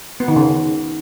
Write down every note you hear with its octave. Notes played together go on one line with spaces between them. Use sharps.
B3
D#3
C#3